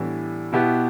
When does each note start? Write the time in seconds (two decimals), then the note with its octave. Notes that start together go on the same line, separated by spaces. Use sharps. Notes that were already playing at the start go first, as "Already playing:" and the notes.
Already playing: A2 E3 G3 B3 D4
0.52 B2 B3 E4 G4